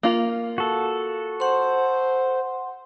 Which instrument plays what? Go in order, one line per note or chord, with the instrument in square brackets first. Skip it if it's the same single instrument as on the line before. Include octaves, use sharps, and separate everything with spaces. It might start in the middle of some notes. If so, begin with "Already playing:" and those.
[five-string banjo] A#3 F4
[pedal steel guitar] F#4 A4
[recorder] C5 [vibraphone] F#5 C6